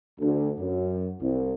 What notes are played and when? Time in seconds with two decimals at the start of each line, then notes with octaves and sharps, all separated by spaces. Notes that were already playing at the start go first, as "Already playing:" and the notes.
0.21 D2
0.59 F#2
1.21 C2